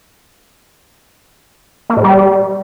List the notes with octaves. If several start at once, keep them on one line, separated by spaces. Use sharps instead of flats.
A#3
A2
G3